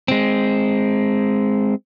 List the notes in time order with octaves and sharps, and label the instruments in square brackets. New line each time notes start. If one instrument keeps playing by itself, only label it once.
[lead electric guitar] G#3 C4